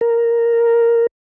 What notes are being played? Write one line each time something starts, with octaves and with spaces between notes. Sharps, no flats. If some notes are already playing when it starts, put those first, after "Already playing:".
A#4